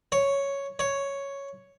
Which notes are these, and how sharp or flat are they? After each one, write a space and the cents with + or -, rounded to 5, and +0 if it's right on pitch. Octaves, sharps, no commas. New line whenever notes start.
C#5 +0
C#5 +0